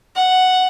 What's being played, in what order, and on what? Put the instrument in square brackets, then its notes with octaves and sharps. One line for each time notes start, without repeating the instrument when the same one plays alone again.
[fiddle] F#5